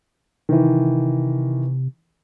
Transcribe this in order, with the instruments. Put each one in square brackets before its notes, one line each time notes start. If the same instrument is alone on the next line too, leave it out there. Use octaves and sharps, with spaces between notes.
[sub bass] C3 [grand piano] D#3 E3